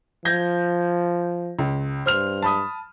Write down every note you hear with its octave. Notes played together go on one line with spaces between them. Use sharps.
F3 G6 G#6 A#6
C#2
G2 C5 F6 F7
A5 B5 D#6